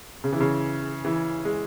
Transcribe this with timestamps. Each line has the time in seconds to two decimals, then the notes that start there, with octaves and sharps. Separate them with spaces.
0.24 C#3
0.33 E3
0.40 C#3
1.05 E3
1.45 G#3